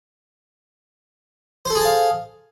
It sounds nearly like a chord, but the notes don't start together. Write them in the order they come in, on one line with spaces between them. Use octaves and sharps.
C5 A4 G#4 A5 F5